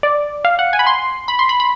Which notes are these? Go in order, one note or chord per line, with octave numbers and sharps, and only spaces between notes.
D5
F5
F#5
G#5
B5
C6
B5
C6
B5
B5